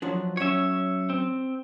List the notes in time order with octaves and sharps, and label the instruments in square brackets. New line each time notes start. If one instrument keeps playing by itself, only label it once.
[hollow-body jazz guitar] F3 F#3 D4
[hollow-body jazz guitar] F#3 C#4 [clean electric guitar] C#5 E5
[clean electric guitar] C4